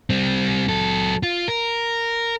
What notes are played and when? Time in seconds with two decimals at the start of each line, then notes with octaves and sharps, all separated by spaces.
0.10 G3 C4
0.68 F#3 A4
1.23 F4
1.48 A#4